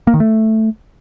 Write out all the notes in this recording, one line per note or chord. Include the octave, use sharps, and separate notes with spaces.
A#3
D#3
A3